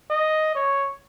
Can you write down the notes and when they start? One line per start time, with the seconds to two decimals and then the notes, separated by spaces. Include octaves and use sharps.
0.10 D#5
0.55 C#5